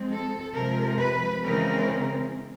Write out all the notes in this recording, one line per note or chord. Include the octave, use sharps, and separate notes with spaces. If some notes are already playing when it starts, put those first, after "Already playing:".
Already playing: F3 G#3 C4
A4
C3 F3 G#3 A#4
B4
C#3 E3 G#3 C4 A#4